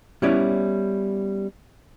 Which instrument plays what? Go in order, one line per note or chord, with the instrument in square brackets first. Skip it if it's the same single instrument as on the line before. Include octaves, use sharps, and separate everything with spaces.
[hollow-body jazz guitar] G3 B3 C#4 E4 C#5 D5